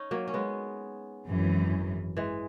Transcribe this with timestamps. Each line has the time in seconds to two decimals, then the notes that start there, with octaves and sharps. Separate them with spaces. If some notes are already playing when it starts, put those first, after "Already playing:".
Already playing: C#4 D#4
0.11 F#3 A#3
0.28 C#4
0.34 G#3 B3
1.25 G#1 F#2 E3
2.17 E3 G#3